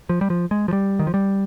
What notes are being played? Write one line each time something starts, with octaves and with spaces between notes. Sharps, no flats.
F3
G3
F3
G#3
F3
G3
D#3
F3
G3